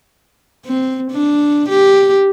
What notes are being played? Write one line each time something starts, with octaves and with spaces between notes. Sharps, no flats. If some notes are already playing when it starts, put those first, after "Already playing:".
C4
D4
G4